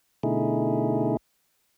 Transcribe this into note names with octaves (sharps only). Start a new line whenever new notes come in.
B2 D3 A3 D#4 E4 G#4